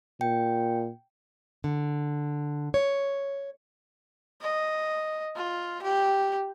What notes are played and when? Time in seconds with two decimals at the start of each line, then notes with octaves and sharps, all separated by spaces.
0.21 A#2 G5
1.64 D3
2.74 C#5
4.42 D#5
5.36 F4
5.83 G4